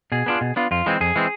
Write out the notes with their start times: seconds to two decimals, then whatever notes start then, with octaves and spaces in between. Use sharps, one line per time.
0.12 B2 G#4
0.26 B3 D4 F4
0.41 B2
0.56 B3 D4 F4
0.71 F2 F4
0.86 E3 G#3 C4
1.00 F2 G#4
1.16 E3 G#3 C4